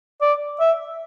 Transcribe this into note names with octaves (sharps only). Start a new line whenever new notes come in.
D5
E5